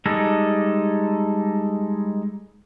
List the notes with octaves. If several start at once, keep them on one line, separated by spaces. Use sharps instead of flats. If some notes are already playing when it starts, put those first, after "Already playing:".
G3 G#3 D#4 A4